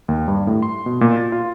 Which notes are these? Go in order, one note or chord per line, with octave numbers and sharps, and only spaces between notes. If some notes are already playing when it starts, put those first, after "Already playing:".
D#2
G2
A2
C6
B2
A#2
A6
F4